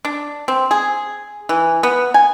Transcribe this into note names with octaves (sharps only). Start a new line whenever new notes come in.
D4
C4
G#4
E3
B3
G#5